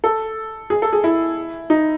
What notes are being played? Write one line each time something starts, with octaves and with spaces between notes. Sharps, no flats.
A4
G#4
A4
G#4
E4
D#4